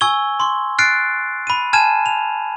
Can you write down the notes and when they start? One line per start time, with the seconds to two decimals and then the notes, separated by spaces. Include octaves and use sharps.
0.01 G#5 C#6 E6 G#6 G7
0.40 C6 C#6
0.79 F6 F#6 A6 C7 D7
1.47 B5 D#7
1.73 G#5 A5 F6 G#6 D#7 E7
2.06 F7